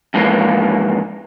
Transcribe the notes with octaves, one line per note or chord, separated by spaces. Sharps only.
F2 G#2 E3 A#3